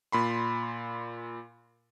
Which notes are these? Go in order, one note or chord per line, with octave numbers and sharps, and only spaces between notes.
A#2 B5 C6